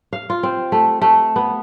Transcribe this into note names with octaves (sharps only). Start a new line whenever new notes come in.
F5
F4
C4
A3
A3
B3